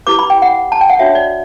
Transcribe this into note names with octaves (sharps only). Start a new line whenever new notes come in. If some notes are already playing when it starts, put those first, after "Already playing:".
E4 G4 B4 D6
B5
G5
F#5
A5
G5
F#5
D4 F#4 C#5 E5
D5